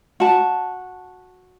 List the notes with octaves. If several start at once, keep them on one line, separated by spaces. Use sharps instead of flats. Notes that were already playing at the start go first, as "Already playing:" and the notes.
F#4 A5